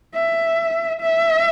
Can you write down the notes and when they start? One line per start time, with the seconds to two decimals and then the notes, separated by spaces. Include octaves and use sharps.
0.14 E5
1.01 E5